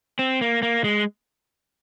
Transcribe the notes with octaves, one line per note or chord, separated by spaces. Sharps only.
C4
A#3
A#3
G#3